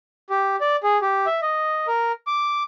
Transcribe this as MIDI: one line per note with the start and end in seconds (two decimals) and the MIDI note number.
0.30 0.56 67
0.61 0.76 74
0.83 0.98 68
1.02 1.26 67
1.26 1.40 76
1.42 1.87 75
1.87 2.12 70
2.27 2.63 86